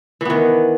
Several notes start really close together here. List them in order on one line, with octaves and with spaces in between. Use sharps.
E3 B3 D#3